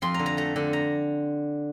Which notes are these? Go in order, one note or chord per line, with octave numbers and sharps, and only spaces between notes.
F2 C6
D3 A#5
A#5
A3 A#5
D3
A#5